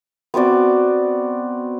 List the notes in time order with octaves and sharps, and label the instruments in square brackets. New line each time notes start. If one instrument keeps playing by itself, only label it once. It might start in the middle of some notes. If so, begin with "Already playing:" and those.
[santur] B3 C4 F#4 D5